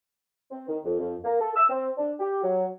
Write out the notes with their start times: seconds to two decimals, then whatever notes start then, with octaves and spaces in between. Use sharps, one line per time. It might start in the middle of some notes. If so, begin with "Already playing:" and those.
0.51 C4
0.68 D#3
0.84 F2
0.99 F2
1.24 A#3
1.41 A4
1.56 E6
1.69 C4
1.97 D4
2.20 G4
2.43 F#3